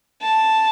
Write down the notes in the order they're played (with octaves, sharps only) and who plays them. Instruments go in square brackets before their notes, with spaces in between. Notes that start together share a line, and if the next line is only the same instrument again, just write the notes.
[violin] A5